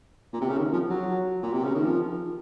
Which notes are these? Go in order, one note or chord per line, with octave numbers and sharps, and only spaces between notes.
A#2
C3
C#3
D#3
F3
F#3
A#2
C3
C#3
D#3
F3